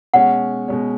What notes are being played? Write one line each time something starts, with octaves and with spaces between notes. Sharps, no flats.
B2 G#3 C#4 F#5
B2 G#3 C#4